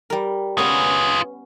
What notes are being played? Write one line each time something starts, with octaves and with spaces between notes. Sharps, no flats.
G3 A#4
B3 C#4 F4 G#4 B4